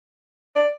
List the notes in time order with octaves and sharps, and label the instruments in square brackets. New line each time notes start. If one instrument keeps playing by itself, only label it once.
[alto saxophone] D5